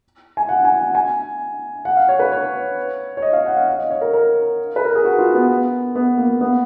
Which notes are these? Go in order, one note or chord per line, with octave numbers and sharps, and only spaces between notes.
G#5
F#5
G#5
F#5
G#5
F#5
F5
C#5
B4
C#5
C#5
D#5
F5
F#5
F5
F5
D#5
C#5
A#4
A#4
B4
A#4
G#4
F#4
F4
B3
B3
A#3
B3